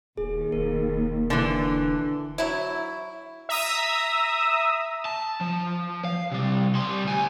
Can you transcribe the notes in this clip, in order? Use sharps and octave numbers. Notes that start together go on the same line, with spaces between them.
D#1 D#2 G#4
E1 A#4
D3 E3
F#3 E4
E5 A#5 D#6 E6
A5
F3
F5
C3 G3
G3 C6
D2 G#5